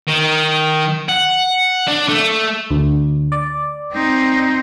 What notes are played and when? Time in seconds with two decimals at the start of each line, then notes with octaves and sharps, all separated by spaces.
0.07 D#3
1.09 F#5
1.87 D4
2.08 A3
2.71 D2
3.32 D5
3.93 C4 D#4